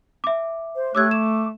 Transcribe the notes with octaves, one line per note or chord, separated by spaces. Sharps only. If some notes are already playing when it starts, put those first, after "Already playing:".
E5 D6
C5
A3 G4 C#5 D6 E6 F#6 G#6
D6 E7